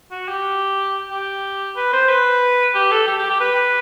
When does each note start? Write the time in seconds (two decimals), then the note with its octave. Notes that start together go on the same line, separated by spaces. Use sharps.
0.11 F#4
0.28 G4
1.11 G4
1.76 B4
1.93 C5
2.09 B4
2.75 G4
2.91 A4
3.07 G4
3.19 G4
3.30 G4
3.41 B4